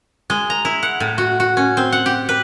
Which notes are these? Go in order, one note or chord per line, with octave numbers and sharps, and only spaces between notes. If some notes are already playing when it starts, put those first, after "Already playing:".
G#3
A#5
E4
F#5
A2
F#4
F#4
C#4
C4
F#5
G4
B4